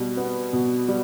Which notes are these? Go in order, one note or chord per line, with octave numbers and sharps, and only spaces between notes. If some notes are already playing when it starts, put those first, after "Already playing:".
Already playing: B2 G3
B3
B2
G3